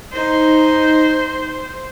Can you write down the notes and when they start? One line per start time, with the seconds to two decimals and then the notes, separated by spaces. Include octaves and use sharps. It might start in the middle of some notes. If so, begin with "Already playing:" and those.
0.13 D#4 C5